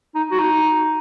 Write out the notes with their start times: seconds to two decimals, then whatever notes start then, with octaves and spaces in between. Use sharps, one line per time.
0.15 D#4
0.31 F#4
0.39 D#4